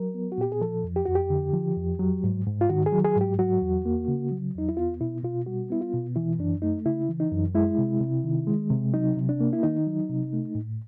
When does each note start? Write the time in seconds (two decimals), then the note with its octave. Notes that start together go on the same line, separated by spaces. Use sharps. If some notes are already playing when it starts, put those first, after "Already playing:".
Already playing: F#3 A#4
0.14 B3
0.32 F#4
0.38 A#2 G4
0.52 G#4
0.61 F3 A4
0.84 F2
0.96 G4
1.05 F2 F#4
1.15 G4
1.30 D3
1.53 F3
1.76 F2
1.99 F#3
2.24 G#2
2.46 G#2
2.61 F4
2.70 D#3 F#4
2.86 G#4
2.92 F#3
3.04 G#4
3.16 G#2
3.21 G4
3.39 F#3 F#4
3.62 E2
3.86 A#3
4.08 C#3
4.32 F#3
4.55 E2 D#4
4.69 E4
4.77 B3 F4
5.01 B2 E4
5.23 B2 F4
5.46 G3 F#4
5.70 B3 E4
5.81 F4
5.94 B2
6.16 E3 E4
6.39 F#2 D4
6.62 A3 D#4
6.86 C#3 E4
7.09 E3
7.20 D#4
7.32 F#2
7.55 G#3 E4
7.78 C3
8.01 C3
8.24 D#3
8.47 G#3
8.70 C3
8.93 F#3 D#4
9.17 C3
9.29 D4
9.41 A#3
9.53 E4
9.63 D#3 D#4
9.87 F#3
10.09 C3
10.33 A3
10.55 A2